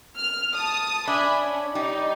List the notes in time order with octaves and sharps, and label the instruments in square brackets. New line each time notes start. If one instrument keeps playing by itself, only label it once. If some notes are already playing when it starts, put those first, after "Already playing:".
[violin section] F6
A5 D#6
[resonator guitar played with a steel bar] D4 [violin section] E5 G#5 B5
[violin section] C#4
[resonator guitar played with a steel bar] G3 [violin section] D#4